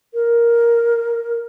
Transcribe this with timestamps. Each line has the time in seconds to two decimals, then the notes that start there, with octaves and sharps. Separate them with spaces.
0.14 A#4